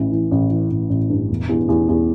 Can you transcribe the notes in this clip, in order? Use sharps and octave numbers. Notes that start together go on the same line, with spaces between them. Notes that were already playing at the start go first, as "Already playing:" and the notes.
Already playing: A1 E3
E3
A1
E3
A1
A1
G2
E1
E2
E2
E2